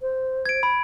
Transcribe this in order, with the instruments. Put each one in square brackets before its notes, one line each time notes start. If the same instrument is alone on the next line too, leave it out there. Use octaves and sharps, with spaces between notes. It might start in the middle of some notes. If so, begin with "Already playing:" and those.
[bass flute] C5
[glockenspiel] G#6 D7
B5